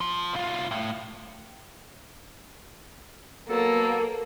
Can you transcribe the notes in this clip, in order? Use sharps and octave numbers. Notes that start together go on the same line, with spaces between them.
F3
C2 F4
A2
F#3 A#3 B3 A4